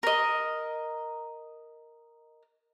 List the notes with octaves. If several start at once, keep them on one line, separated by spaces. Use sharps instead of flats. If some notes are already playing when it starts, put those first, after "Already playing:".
A#4 D#5